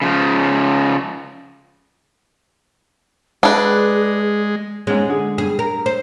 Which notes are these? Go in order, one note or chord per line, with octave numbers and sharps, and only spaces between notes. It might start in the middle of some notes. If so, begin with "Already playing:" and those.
C#3 F3
G#3 D4 G#4 B4
G#2 G#3 C#4
D3 G#4
G2 G#4
A#4
C5